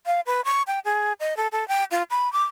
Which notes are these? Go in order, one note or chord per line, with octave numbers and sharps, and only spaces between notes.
F5
B4
C#6
G5
G#4
D#5
A4
A4
G5
F4
B5
D6